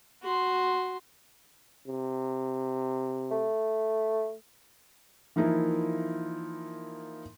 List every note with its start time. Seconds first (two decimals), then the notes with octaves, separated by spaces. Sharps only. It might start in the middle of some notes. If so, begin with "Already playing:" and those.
0.23 F#4 C6
1.88 C3
3.31 A3
5.36 E3 F3 A#3 D#4 E4 A#4